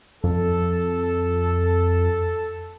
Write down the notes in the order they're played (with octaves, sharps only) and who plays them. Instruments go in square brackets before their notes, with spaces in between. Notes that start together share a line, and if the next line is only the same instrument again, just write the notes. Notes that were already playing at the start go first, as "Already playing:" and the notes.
[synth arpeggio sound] F2 [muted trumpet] A4